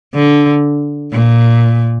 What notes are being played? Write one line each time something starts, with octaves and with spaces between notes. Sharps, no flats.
D3
A#2